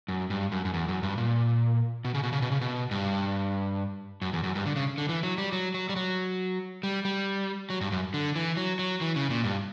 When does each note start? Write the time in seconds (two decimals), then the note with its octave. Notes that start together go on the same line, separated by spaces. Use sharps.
0.08 F#2
0.30 G2
0.52 F#2
0.65 F#2
0.74 E2
0.88 F#2
1.03 G2
1.18 A#2
2.05 B2
2.14 C#3
2.23 B2
2.33 C#3
2.42 B2
2.52 C#3
2.61 B2
2.91 G2
4.22 F#2
4.33 E2
4.43 F#2
4.55 G2
4.66 D3
4.76 C#3
4.98 D3
5.09 E3
5.23 F#3
5.38 G3
5.52 F#3
5.74 F#3
5.89 G3
5.96 F#3
6.83 G3
7.05 G3
7.70 F#3
7.81 G2
7.92 F#2
8.14 D3
8.36 E3
8.57 F#3
8.79 F#3
9.01 E3
9.16 C#3
9.30 A#2
9.44 G2